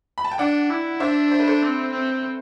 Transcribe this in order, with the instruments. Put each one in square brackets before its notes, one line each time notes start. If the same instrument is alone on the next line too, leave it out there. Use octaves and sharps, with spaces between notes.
[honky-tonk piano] B5
A5
G5
[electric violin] D4 [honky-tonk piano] D5 F#5
[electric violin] E4
[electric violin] D4 [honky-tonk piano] C5 E5
[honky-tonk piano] C5
B4
A4 C5
[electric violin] C4
C4